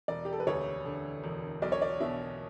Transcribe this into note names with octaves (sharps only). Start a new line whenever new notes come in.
E1 D5
G4
A4
B4
D2 C#5
D3
E1
B1 D5
C#5
D5
B2 E5